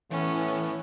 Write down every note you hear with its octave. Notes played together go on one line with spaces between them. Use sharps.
A2 E3 B3 C#4